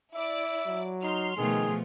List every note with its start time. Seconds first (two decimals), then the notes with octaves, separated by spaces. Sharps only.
0.15 E4 D5 E5 D6
0.67 F#3
1.03 D#4 C6 F6
1.37 B2 D#3 F3 A3 G#4